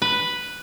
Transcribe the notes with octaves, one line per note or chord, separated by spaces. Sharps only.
B4